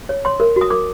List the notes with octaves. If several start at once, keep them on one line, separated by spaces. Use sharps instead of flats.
C#5
C#5 C6
A#4
F#4
D#6
A#4 D6